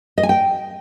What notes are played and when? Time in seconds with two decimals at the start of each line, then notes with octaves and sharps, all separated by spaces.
0.18 D#5
0.23 G#5
0.29 G5